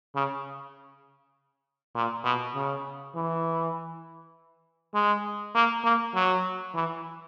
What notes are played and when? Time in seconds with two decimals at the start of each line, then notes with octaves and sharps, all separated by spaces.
0.15 C#3
1.95 A#2
2.24 B2
2.55 C#3
3.15 E3
4.94 G#3
5.55 A#3
5.84 A#3
6.15 F#3
6.75 E3